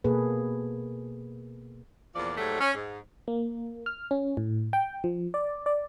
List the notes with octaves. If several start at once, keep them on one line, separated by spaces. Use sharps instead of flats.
B2 A#3 G#4 A4 B4
E2 A#2 F3 D5
G#2 F#3 G3 A3
C#4
G#2
A#3
F6
C#4
A2
G5
F3
D5
D5